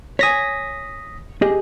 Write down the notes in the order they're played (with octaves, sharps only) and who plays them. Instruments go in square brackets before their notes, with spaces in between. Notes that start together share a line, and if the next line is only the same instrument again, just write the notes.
[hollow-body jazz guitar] C#5 G#5 [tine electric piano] D#6 A#6 B6
[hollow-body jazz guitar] G4 G#4 D#5